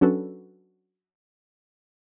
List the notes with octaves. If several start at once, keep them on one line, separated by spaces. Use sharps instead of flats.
F#3 C#4 D4 F#4 A4 B4